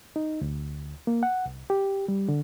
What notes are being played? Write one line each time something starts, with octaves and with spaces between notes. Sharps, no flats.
D#4
D2
A#3
F#5
C2
G4
G3
D3